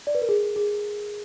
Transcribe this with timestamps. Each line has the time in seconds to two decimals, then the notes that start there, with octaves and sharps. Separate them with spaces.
0.07 D5
0.15 B4
0.22 A#4
0.29 G#4
0.56 G#4